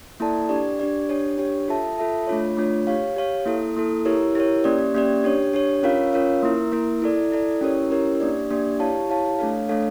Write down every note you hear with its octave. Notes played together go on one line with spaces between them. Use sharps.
A#3 E4 A4 D5 A5
D4 G4 D5
D4 G4 D5
D4 G4 C#5
D4 G4 C#5
F4 A4 E5 A5
F4 A4 E5 A5
A3 D4 F4 C#5
A3 D4 F4 C#5
G4 C#5 F5
G4 C#5 F5
A#3 E4 A4
A#3 E4 A4
E4 G4 A#4 C#5
E4 G4 A#4 C#5
A#3 C#4 G4 D5
A#3 C#4 G4 D5
D4 G4 C#5
D4 G4 C#5
C#4 F4 A#4 C#5 F5
C#4 F4 A#4 C#5 F5
A#3 E4 A#4
A#3 E4 A#4
E4 A4 D5
E4 A4 D5
C#4 E4 G4 A#4 C#5
C#4 E4 G4 A#4 C#5
A#3 D4 G4 D5
A#3 D4 G4 D5
E4 G4 C#5 F5 A5
E4 G4 C#5 F5 A5
A3 D4 A4 C#5 F5
A3 D4 A4 C#5 F5